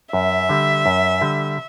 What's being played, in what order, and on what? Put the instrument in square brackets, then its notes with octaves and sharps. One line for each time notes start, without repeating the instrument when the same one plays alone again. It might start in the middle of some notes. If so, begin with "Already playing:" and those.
[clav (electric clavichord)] F#2 [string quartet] E5
[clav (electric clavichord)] D3 G3
F#2
D3 G3